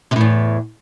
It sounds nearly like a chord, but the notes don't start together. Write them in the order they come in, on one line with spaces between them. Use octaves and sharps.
C3 A2 E2